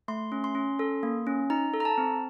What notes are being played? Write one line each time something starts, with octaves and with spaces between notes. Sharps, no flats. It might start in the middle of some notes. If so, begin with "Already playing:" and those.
A3 C6
C#4
C6
C#4
A4
A#3
C#4
D#4 A#5
A4
A#5
A5
C4